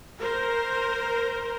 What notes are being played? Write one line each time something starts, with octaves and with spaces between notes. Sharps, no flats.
A#4 C5